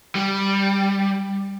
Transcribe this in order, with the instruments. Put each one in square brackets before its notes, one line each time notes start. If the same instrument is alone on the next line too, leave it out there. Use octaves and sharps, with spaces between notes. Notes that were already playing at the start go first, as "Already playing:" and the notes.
[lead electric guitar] G3